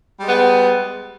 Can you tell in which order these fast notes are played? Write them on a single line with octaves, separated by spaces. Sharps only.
G3 G#3 B3